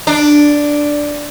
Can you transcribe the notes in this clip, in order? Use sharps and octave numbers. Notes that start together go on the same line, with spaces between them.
D4